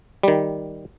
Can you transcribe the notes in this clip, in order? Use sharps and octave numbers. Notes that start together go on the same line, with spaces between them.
D#3 G3